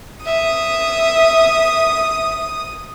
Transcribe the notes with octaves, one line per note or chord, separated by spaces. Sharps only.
E5 D#6